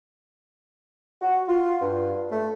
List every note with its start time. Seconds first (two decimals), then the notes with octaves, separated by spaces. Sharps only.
1.22 F#4
1.48 F4
1.81 G2
2.31 A3